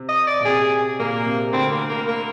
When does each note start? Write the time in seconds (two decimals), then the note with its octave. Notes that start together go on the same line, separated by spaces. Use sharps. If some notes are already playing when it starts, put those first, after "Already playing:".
Already playing: C3
0.09 D#5
0.27 D5
0.41 A#2
0.45 C3 G#4
0.99 A#2 A#3
1.26 C3
1.53 D2 D3 C4
1.71 A#3
1.89 A#3
2.08 A#3